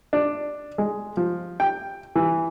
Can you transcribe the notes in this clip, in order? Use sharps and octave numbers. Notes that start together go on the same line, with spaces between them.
D4
G#3
F3
G5
E3